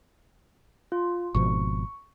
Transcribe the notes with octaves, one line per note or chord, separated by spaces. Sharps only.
F4
G#1 B2 F3 C#6